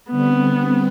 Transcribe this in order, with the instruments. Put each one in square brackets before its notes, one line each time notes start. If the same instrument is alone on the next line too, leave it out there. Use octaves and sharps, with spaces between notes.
[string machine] D3 G3 C4 [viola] B3